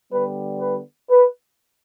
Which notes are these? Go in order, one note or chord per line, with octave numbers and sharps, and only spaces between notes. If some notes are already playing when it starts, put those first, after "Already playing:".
D3 G3 B3 B4
B4
B4